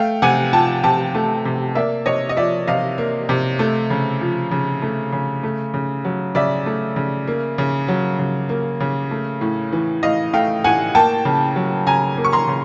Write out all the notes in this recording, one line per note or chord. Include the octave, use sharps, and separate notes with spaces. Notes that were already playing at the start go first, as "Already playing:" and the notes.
Already playing: A3 F5 G5
C3 F#5 G#5
F3 G5 A5
C3 G5 A5
A3
C3
A#3 D5 E5
C3 C#5 D#5
D#5
F3 D5 E5
C3 D#5 F5
A#3
C3
A3
C#3
F3
C#3
A3
C#3
A3
C#3
F#3
C#3 D5 E5
A3
C#3
A#3
C#3
F#3
C#3
A#3
C#3
A3
A2
E3
A2 D#5 F5
A3 F5 G5
A2 F#5 G#5
A#3 G5 A5
C#3
F#3
C#3 G#5 A#5
A#3
C#6
A#5 C6
C#3